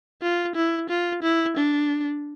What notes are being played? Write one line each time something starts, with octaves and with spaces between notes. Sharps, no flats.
F4
E4
F4
E4
D4